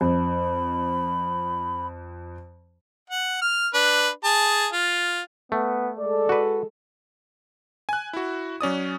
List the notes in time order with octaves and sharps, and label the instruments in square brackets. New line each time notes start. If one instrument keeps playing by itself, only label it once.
[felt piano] F2 [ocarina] B5
[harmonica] F#5
F6
D4 B4
G#4 A5
F4
[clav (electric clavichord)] A3 [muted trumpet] B3
[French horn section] G#3 A4 [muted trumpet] D5
[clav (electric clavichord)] F#4 B4
[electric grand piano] G#5 F#6
E4 F#4
F#3 C#4 D5 D#6